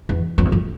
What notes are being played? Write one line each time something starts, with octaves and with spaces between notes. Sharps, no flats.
E2
F2
E2
F2